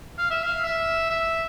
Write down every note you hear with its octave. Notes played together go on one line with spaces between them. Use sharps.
F5
E5
F5
E5
E5